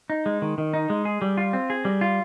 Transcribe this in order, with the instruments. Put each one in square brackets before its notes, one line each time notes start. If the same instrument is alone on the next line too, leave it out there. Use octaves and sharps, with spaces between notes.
[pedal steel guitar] D#4
G#3
D#3
D#3
D#4
G#3
G#4
G3
F4
C4
G#4
G3
F4